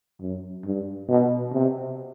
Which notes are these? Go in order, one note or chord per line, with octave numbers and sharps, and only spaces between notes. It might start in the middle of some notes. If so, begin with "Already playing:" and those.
F#2
G2
B2
C3